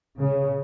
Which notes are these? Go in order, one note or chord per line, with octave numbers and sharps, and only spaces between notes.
C#3